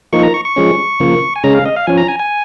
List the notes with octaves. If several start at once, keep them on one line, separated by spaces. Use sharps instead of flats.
F3 A#3 D#4 C#6
A#5
C#6
C#6
F3 G#3 C#4
C#3 F3 A#3
G#5
C#3 G#3 C#4 A#5
F5
D#5
F5
F3 C#4 G#5
A#5
G#5
G#5